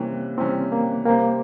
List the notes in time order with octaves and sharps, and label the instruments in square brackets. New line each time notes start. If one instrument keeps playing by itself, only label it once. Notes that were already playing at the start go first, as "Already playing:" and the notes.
Already playing: [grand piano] C3 E3 G3 C#4 [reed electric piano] A#3
[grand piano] C3 E3 G3 C#4 [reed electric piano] C4
[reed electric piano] A#3
[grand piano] C3 G3 C4 G4 [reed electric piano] A#3